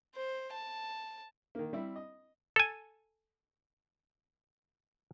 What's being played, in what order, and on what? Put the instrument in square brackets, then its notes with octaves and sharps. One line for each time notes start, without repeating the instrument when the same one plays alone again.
[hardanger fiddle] C5
A5
[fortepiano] D#3 A#3
G3 C4 E4
D#5
[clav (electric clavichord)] A4 G#5